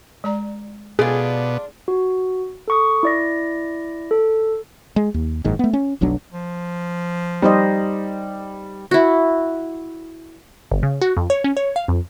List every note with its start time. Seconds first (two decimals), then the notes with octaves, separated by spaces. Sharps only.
0.24 G#3 D5 A#5
0.99 B2 D4 F4 G#4 A4
1.88 F#4
2.68 A4 C#6 D#6
3.03 E4 D5 A#6
4.11 A4
4.96 G#3
5.14 D#2
5.44 F#1 G#2 D#3
5.59 A3 B3
5.73 C#4
6.01 F1 B1 F#3 D4
6.33 F3
7.42 G3 D#4 C5 D#5
8.91 E4 F#4
10.71 G1
10.83 C#3
11.02 F#4
11.17 F2
11.30 C#5
11.44 C#4
11.57 C#5
11.76 F5
11.88 F2